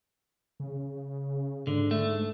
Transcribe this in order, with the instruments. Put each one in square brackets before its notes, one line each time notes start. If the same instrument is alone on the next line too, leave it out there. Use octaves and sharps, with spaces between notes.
[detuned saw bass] C#3
[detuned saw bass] G#2 [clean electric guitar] D3
[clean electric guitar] A3